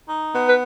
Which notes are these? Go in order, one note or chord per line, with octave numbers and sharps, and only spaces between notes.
D#4
B3
B4